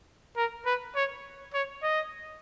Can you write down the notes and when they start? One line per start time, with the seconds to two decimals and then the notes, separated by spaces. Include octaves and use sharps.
0.37 A#4
0.66 B4
0.96 C#5
1.54 C#5
1.83 D#5